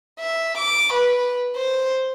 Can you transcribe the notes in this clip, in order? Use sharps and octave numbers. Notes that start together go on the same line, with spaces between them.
E5
D6
B4
C5